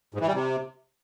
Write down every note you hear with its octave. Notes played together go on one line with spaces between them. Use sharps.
G#2
E3
G3
C3